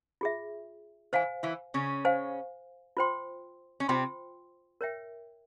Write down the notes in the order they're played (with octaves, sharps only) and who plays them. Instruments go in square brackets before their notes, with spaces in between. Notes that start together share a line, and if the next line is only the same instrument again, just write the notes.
[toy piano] F4 G#4 E5
[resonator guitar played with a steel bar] E3 E4 [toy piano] C5 F5 G#5
[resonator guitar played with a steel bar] E3 E4
C#3 C#4
[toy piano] C5 F5 G#5
F4 C5 G5 C6
[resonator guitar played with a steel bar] C#4
[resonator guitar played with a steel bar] C3 C4 [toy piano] F4 C5 G5 C6
[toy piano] A#4 C#5 E5 G5